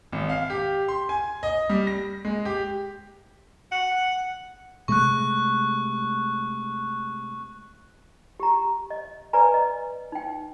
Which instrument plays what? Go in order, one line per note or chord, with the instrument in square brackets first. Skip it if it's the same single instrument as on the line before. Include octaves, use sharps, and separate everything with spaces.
[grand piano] G#1
F5
G4
C6
G#5
D#5
G3
A#6
G#3
G4
[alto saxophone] F#5
[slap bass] C3 G#3 A3 [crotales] C#6 F#6
[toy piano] G4 A#5
D#5
B4 D5 G#5 A#5
D#5
D#4 G5